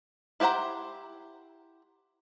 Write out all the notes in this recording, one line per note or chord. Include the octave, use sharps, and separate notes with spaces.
E4 G4 C5 F#5 A#5